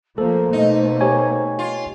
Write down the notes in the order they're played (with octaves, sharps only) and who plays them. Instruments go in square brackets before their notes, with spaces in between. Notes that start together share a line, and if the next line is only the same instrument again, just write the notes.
[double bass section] F3 A3 A#3 [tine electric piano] A4 [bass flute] C5
[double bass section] B2 A3 A#3 [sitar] D#4
[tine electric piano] G4 C#5 G#5
[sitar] F4